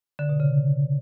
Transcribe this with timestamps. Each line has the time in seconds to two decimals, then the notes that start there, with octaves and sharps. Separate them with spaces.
0.19 D3
0.29 B2
0.40 C#3